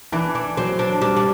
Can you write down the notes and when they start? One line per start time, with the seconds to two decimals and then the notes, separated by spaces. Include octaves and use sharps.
0.12 E3 D4
0.35 D4
0.57 F#3 C4
0.79 D4
1.01 G3 D4
1.16 D4